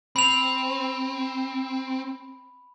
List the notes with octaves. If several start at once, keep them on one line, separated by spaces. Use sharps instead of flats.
C4 B5 F7